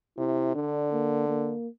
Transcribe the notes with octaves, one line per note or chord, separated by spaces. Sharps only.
C3 E4
D3 D4
A#3
A#3